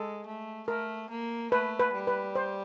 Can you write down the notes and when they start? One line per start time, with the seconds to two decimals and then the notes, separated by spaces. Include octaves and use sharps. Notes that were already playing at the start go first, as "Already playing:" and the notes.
Already playing: G#3 A4
0.26 A3
0.68 A3 A#4
1.10 A#3
1.52 A3 B4
1.80 B4
1.93 G3
2.07 B4
2.35 C5